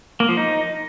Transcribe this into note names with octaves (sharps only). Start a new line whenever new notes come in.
A#3
F3
D#4